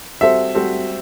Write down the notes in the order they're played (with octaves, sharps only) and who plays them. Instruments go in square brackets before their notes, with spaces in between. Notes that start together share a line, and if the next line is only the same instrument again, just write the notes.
[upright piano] G3 C4 F#4 A4 C5 [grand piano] E5
[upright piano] G3 C4 F#4 A4 C5